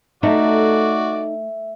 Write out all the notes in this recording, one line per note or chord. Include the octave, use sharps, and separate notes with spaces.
A3 D#4 F#4 D5 E5